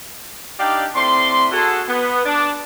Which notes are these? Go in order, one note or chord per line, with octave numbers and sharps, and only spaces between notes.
D4 D#4 G4 D5 F5 G5
A2 C4 D5 C6
F#4 G#4 A4
B3
D4